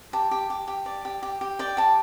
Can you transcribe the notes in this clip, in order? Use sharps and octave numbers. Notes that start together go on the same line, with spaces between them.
G4 A5
G4
G4
G4
D5
G4
G4
G4
D5 G5
G4 A5